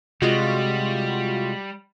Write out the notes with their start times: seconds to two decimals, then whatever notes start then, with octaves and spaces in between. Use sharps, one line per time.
0.22 C3 G3 G#3 F4 F#4 D#5